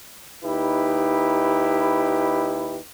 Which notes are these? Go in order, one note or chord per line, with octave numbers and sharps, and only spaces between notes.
D#2 D#4 E4 G4 B4